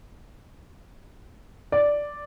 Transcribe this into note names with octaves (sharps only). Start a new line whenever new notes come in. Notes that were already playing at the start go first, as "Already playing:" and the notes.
D5